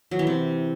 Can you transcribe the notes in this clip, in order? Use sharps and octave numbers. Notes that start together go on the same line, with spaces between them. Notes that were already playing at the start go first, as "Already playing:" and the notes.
F#3
E3
C3